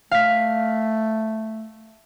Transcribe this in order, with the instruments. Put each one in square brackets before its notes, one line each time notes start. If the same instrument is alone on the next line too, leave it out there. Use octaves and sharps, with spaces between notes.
[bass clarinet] A3 [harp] F5 B6